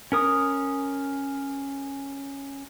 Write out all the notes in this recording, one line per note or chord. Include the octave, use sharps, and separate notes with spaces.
C#4 A#4 D#6